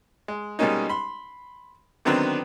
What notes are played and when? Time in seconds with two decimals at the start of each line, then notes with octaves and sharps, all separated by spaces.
0.28 G#3
0.59 B2 G3 G#3 A#3 C#4 D#4
0.89 B5 C6
2.05 D3 D#3 F#3 B3 C4 D4